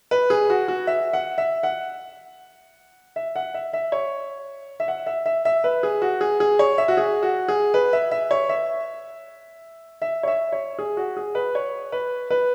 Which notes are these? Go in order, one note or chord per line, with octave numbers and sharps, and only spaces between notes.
B4
G#4
F#4
F#4
E5
F#5
E5
F#5
E5
F#5
E5
E5
C#5
E5
F#5
E5
E5
E5
B4
G#4
F#4
G#4
G#4
C#5
E5
F#4
G#4
F#4
G#4
B4
E5
E5
C#5
E5
E5
C#5
E5
C#5
G#4
F#4
G#4
B4
C#5
B4
B4